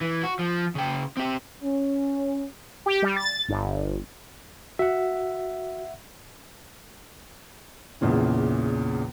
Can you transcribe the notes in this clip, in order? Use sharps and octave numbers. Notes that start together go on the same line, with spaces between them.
E3
F#4
F3
C#3 G5
C4 G4
C#4
G4
G3
A6
G1
F#4 E5 F#5
A#1 E2 A#2 C#3 E3